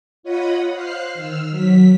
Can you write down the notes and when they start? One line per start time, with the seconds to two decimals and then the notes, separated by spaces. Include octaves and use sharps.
0.23 F4 C#5 D#5 F#5 B5 D#6
0.72 C5 F5 F6 F#6 C7
1.15 D#3 E6 F6
1.51 F#3 B6